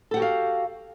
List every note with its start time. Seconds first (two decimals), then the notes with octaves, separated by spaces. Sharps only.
0.11 A4
0.14 F#5
0.17 G4
0.19 F#4
0.22 F5